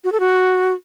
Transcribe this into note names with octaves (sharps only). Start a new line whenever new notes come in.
F#4
A4
F#4